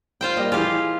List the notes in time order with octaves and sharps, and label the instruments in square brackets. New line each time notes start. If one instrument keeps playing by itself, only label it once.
[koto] F4 C5 G5
[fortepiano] G3 A#3 [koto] D#5
[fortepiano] E3 G#4 [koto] F4 G4